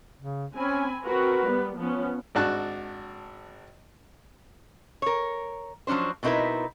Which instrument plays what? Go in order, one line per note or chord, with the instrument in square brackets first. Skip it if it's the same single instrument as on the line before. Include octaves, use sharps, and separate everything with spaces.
[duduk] C#3
[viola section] C4 G#5 B5 [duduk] C#4
[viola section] C4 F#4 A#4 [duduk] B4
[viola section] G3 B3
F3 B3 C#4
[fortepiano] G#1 D4 F#4 A5 F#6
[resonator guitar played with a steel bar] A#4 C#5
F3 F#3 C#4 D4 C5
B2 C4 D#4 E4 A#4 B4